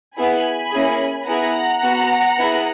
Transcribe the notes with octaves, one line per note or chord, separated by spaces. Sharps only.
B3 E4 G#4 G#5 B5
A#3 C#4 E4 G#4
B3 E4 G#4 F#5 A#5
B3 F#4
B3 E4 G#4